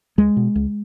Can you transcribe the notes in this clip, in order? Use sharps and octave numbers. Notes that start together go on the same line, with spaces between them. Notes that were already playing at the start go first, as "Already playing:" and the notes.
C#2 G#3
B2
C#2